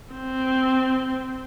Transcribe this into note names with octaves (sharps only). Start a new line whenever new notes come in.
C4